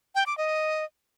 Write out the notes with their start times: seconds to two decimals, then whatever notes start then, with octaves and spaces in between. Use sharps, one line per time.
0.15 G5
0.26 D6
0.38 D#5